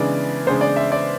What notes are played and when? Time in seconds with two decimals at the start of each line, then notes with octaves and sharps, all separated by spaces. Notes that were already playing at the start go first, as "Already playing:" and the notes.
Already playing: C#3 E3 G#3 B3 D4 D5
0.46 C#3 E3 G#3 B3 D4 C5
0.61 D5
0.76 E5
0.92 D5